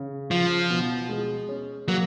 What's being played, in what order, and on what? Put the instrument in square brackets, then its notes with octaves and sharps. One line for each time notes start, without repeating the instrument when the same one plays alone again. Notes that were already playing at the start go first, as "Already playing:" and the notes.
Already playing: [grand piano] C#3
[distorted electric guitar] F3 [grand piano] F4
[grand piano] B2
G#3
C#4
[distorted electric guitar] F#3 [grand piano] A#3